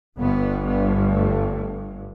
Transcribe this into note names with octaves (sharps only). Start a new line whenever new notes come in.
G1 G2 B3
B3
A3